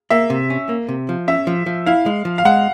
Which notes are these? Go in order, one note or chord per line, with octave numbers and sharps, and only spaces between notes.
A#3 E5
C3
C#4
A#3
C3
F3
C#4 E5
F3
F3
E4 F5
G#3
F3
F5
G#3 F#5